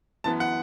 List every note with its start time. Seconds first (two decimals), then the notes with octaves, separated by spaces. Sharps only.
0.24 F#2 E3 B3 A5
0.40 F#5